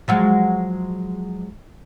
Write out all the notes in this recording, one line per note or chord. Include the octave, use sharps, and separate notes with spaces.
F3 F#3 G#3